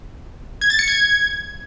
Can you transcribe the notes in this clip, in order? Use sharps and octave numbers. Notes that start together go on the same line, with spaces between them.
G#6
A6
C#7
G#6